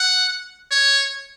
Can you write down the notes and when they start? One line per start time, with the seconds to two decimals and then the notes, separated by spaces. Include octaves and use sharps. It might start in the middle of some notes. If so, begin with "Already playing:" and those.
Already playing: F#5
0.71 C#5